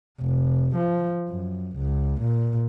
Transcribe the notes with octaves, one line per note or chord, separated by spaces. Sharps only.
F1
F3
F#2
C#2
A#2